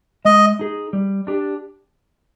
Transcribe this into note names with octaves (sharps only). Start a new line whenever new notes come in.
G#3 D#5
D#4 G#4
G3
D4 G4